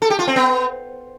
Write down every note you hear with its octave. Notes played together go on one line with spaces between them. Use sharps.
A4
G4
F4
C4
B3